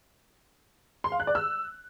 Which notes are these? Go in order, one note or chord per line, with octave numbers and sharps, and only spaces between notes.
C6
F5
F#6
D5
E6